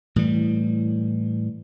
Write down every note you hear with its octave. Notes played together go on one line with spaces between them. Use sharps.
A2 E3 G3